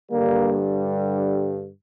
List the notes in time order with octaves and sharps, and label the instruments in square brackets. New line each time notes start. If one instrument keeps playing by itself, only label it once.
[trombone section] G2 D3 G3 A#3